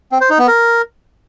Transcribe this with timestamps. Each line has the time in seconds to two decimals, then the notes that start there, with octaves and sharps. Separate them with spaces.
0.12 C4
0.21 C5
0.30 D#4
0.39 B3
0.48 A#4